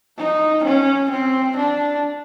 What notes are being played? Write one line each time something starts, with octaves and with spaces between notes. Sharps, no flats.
D#4
C#4
C4
D4